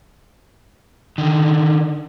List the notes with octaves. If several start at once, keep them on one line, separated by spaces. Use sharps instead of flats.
D3 D#3